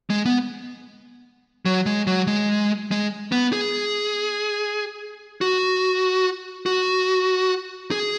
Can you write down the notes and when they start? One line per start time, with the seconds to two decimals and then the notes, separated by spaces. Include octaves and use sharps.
0.10 G#3
0.25 B3
1.65 F#3
1.86 G#3
2.07 F#3
2.28 G#3
2.91 G#3
3.32 B3
3.53 G#4
5.41 F#4
6.66 F#4
7.91 G#4